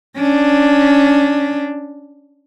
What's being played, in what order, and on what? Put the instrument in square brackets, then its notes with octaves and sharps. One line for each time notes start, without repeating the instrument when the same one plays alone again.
[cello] C#4 D4